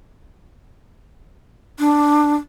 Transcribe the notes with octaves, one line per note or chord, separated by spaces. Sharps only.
D4